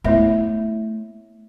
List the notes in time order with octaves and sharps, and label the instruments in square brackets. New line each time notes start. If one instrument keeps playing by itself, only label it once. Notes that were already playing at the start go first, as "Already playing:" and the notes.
[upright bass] A3 [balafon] B3 E4 [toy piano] C#5 E5 B5